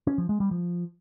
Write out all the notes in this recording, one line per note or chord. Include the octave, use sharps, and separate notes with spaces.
C#4
F3
G#3
G3
F3